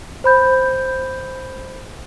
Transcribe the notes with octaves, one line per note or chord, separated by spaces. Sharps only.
C5 B5 G6